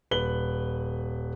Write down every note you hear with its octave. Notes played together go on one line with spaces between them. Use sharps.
D#1 B4 F#7 G7